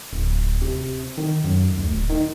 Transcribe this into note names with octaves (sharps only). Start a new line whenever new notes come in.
D1
C3
D#3
F#2
D2
D1
D#3